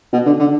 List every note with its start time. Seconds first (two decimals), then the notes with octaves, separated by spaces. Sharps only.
0.13 B2
0.26 D3
0.39 D3